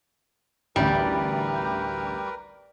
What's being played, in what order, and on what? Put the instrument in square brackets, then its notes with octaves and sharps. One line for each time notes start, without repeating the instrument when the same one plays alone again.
[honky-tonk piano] A1 D2 [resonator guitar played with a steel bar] G3 [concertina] A#4 B4